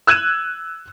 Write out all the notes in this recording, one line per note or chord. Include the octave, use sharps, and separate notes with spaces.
E6 F#6 G#6 D#7 E7